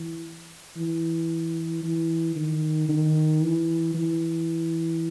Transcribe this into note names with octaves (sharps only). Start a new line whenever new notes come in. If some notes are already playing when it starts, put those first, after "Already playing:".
Already playing: E3
E3
E3
D#3
D#3
E3
E3